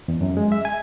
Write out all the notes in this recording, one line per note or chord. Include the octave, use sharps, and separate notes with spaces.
E2
F#2
G#3
E5
G#5